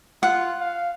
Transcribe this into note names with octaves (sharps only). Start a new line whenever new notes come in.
F4 F#5
F5